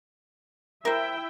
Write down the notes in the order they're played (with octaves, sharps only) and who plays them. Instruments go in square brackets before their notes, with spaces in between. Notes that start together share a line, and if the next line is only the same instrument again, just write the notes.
[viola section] E4 E5 G5 [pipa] A#4 C5